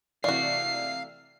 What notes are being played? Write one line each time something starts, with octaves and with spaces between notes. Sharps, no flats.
C3 E3 A3 F#4 D5 F5 C7